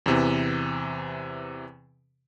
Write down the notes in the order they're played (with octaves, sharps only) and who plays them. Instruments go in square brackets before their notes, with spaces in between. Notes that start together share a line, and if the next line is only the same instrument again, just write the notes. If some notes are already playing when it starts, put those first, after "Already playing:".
[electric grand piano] E2 C3 E3